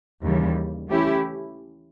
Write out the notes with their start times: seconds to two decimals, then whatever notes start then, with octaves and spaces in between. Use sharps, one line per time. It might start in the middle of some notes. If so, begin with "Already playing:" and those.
0.22 D#2 C#3 E3 G3
0.88 E3 A3 C#4 E4 G4